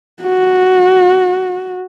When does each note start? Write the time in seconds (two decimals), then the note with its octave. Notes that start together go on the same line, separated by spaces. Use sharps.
0.22 F#4